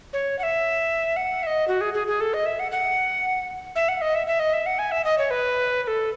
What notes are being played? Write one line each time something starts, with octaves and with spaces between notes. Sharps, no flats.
C#5
F#5
E5
F#5
E5
D#5
F#4
G#4
G#4
G#4
A4
D#5
E5
F#5
F#5
E5
F#5
D#5
E5
E5
D#5
E5
F#5
G#5
E5
D#5
C#5
B4
B4
A4